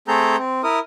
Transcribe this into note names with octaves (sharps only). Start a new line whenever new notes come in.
A3 C4 G#4 A4 A#5 G6
C4
E4 A#4 D#6